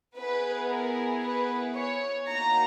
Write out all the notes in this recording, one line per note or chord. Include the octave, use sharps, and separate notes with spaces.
B3 E4 G#4 B4
A#4
B4
C#5
A#3 D#4 F#4 A#5